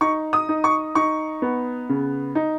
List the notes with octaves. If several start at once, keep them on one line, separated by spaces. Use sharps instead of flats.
D#4 C#6
D#6
D#4
C#6
D#4 C#6
B3
C#3
D#4